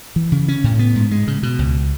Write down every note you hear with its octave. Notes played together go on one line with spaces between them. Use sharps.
E3
C#3
C#4
A2
B3
G#2
G#3
C#3
B2
C#2